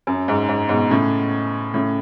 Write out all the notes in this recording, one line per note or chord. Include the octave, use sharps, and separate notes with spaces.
F#2
G#2
G#2
G#2 B2
A2 C#3
A2 C#3